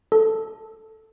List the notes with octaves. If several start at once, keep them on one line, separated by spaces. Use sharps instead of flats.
A4